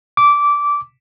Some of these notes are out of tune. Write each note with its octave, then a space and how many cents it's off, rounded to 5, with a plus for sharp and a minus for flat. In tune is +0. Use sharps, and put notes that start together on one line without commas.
D6 -15